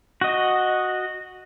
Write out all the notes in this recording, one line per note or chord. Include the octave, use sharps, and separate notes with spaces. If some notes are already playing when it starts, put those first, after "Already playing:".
F#4 D#5